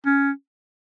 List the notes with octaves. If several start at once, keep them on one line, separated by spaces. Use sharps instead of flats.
C#4